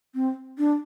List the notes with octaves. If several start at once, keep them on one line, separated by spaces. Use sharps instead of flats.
C4
D4